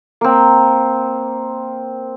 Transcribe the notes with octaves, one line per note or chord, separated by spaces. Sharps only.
A#3 C4